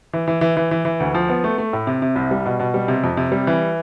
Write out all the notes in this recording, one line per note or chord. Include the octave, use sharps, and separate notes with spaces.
E3
E3
E3
E3
E3
E3
D2
F3
B3
A3
A3
A2
C3
C3
C2
G3
B2
B2
G3
C3
F2
C3
G3
E3